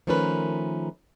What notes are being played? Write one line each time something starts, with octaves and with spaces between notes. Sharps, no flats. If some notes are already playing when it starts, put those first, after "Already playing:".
D#3 F3 A3 C#4 A#4 B4